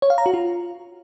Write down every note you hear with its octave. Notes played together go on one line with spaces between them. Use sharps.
C#5
F5
A#5
F#4
F4